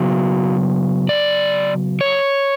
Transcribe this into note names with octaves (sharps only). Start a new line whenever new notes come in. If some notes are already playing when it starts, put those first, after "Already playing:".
Already playing: C#3 F#3 B3 F#4
D5
C#5